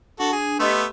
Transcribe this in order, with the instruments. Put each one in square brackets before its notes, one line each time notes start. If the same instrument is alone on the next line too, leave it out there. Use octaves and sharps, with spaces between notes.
[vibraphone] D4 [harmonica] F#4 A4
[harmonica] G#4
[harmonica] A3 B3 [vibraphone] G4 D#5 C6